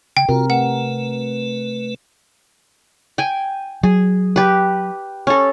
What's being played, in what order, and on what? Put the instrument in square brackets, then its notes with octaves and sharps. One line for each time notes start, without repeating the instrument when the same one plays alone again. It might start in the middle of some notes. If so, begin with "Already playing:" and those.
[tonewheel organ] C#3 [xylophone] G5
[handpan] C3 A#4 [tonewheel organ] F4 F#4
[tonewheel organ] A3 B4 [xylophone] F#5
[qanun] G5 G#5
[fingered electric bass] F#3 [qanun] G#4
[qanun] G4 B4
C#4 A4